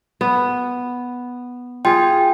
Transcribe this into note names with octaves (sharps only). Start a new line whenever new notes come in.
B3
F4 G#4 G5